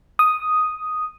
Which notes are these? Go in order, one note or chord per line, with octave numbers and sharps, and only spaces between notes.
D#6